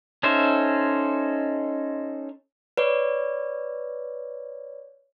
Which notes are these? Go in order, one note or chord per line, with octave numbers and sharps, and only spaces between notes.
C#4 D#4 A4 C5 E5
B4 C#5 D5